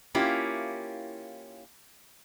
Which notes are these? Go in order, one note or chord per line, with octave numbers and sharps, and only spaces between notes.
A#3 C#4 E4 F4 G4